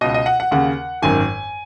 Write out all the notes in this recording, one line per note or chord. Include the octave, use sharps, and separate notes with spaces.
C#2 B2 D#5
D#5
F#5
F#5
D#2 C#3 F#5
G#1 F#2 D#3 G#5